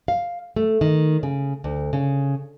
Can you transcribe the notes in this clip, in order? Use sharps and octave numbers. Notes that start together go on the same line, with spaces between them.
F5
A3
D#3
C#3
D2
C#3